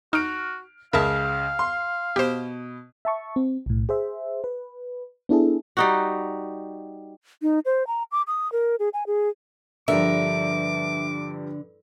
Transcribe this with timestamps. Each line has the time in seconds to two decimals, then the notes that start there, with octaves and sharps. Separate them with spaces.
0.13 D#4 F#4 F6 D7
0.93 C#2 C#3 A#4 E5 F5 A5
1.59 C6
2.16 B2 G4 C5
3.05 E5 A5 C#6
3.36 C4
3.66 B1 A2
3.89 G#4 C5 E5
4.44 B4
5.29 B3 D4 E4 G#4 A4
5.77 G3 D#4 F#4
7.42 D#4
7.65 C5
7.87 A#5
8.12 D6
8.27 D#6
8.52 A#4
8.79 G#4
8.94 G#5
9.07 G#4
9.88 G2 D3 F3 G3 A#4 E5 D6